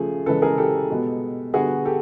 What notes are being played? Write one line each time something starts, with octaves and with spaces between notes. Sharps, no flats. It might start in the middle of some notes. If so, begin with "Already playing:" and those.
Already playing: C#3 F3 A3 G#4
C#3 E3 G#3 A4 B4
G#4 A#4
G4 A4
B2 G#3 B3
D3 G3 B3 F#4 G#4
G4 A4